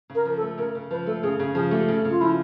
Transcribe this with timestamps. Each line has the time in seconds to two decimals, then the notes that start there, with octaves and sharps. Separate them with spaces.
0.10 C#3
0.15 A#4
0.25 F3
0.37 A4
0.42 A3
0.58 C#3 A#4
0.75 C#3
0.91 F3 B4
1.06 A3 A4
1.23 C#3 G#4
1.39 C#3 G#4
1.55 F3 G#4
1.71 A3 G4
1.88 C#3
2.05 C#3
2.10 F4
2.20 F3 E4